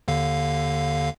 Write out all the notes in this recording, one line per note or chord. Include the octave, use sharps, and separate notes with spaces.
D#2 D3 F5